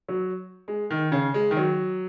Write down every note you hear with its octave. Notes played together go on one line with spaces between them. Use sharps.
F#3
G#3
D#3
C#3
G#3
D#3
F#3